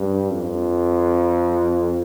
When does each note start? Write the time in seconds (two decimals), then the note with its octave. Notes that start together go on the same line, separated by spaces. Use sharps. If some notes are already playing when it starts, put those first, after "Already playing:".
Already playing: G2
0.31 F2